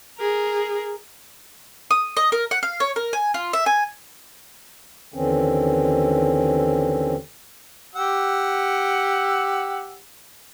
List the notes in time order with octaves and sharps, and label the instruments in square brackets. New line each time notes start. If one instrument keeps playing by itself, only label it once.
[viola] G#4 A#4
[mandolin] D#6
D#5
A#4
F#5
F5
C#5
A#4
G#5
F4
E5
G#5
[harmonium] D#2 D3 E3 C4 C#4
[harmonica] G4 F#5 E6